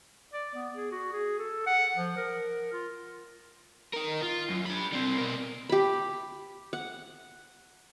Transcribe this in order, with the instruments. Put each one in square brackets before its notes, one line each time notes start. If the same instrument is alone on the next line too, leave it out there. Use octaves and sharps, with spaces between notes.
[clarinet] D5
B3
G#4
F#4
G#4
A4
F#5
F3
A#4
F4
[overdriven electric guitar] D#4 A#4
F4
F#2
D4 B5
G3 C4
B2 A#4
[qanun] G4 B5
F#5